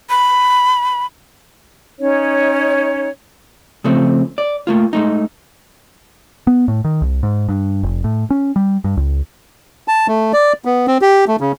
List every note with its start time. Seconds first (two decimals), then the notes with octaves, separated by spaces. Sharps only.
0.10 B5
1.99 C#4 D#4 C#5
3.84 C#3 F3 A3 C4
4.38 D5
4.67 A3 A#3 F4
4.93 G#3 A3 D#4
6.47 B3
6.68 A2
6.84 D#3
7.02 C2
7.23 G#2
7.49 G2
7.83 F1
8.04 A2
8.30 C#4
8.56 G3
8.84 G2
8.97 C#2
9.88 A5
10.08 A3
10.33 D5
10.65 B3
10.87 C4
11.02 G4
11.28 A3
11.41 C#3